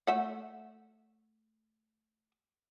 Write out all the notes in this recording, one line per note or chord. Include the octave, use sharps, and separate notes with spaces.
A3 E5 F#5